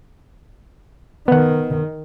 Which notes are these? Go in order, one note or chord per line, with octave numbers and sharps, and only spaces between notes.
D#3 B3 F#5